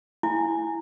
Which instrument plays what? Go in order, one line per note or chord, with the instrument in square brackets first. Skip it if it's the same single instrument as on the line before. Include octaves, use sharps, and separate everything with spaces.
[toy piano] E4 [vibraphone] G#5